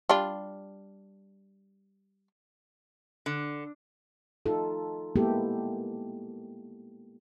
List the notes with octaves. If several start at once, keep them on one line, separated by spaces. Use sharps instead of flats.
G3 D4 F4
D3
D#4 F4 A4
G#3 A#3 B3 E4 G4 A4